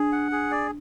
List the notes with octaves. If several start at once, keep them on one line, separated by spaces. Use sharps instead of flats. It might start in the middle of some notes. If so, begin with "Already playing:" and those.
Already playing: D4 G#4
F#5
G#4
D5